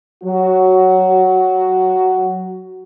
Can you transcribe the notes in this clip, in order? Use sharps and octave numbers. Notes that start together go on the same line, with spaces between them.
F#3 F#4